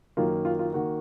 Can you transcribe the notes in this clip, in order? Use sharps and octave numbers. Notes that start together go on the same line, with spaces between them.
F#2 D#3 A#3 F4
F4
F4
D#3 A#3 F#4